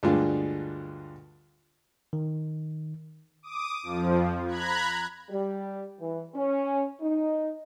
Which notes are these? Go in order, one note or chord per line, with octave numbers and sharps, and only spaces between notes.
D2 G2 G#3 D4 F4
D#3
D6 D#6
F2 F3
A#5 B5 F#6 G#6
G3
E3
C#4
D#4